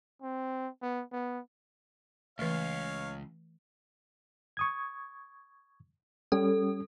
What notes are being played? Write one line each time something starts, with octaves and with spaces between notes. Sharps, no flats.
C4
B3
B3
C#2 E3 A3 C#5 F5
C#6 D#6 G#6
G3 C#4 A4